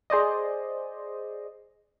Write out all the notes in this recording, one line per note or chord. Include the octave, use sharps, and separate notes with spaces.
G#4 C5 D5 D#5